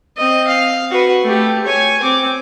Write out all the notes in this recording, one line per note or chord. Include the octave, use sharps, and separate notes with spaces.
C4 D#5
F5
F#4 B4
A3 G4
C#5 G#5
C4 D6